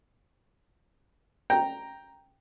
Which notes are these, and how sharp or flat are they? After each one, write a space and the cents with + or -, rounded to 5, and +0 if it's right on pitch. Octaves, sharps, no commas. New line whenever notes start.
G5 +0 A#5 +0